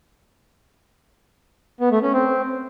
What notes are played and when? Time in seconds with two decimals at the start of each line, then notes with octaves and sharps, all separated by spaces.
1.80 B3
1.91 A3
2.02 C#4
2.14 C4